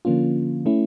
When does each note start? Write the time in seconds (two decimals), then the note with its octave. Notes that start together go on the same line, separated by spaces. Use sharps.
0.05 D3 F3 A#3 C#4 F4
0.66 A3 C#4 E4